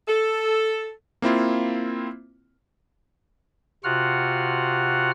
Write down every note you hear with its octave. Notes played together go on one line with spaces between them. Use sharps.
A4
A#3 C4 E4 F4
C3 F4 F#4 F#5 F6